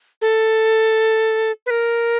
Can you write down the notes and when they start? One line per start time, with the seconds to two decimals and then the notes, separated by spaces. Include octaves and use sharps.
0.22 A4
1.66 B4
1.70 A#4